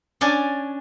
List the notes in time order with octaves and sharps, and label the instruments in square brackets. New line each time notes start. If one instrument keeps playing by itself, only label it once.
[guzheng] C#4 D4 D5 G#5